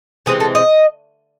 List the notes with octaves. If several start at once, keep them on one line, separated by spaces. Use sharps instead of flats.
C3 E3 G#3 C4 G#4
A4
D#5